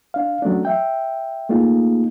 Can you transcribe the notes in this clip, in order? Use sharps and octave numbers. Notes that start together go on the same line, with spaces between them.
D4 F5
F#3 A3 C#4 D4
E5 G5
A3 A#3 D#4 F4 G#4